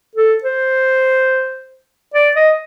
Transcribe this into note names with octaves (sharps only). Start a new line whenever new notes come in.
A4
C5
D5
D#5